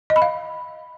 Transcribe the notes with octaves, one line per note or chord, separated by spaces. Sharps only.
D#5
B5
F5